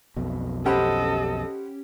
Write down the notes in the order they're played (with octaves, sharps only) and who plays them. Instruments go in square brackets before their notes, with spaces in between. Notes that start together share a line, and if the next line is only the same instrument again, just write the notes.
[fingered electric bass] B1 F2 B2
[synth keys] C#4 G4 [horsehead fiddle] A4 D#5 [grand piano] C5 F#5 B5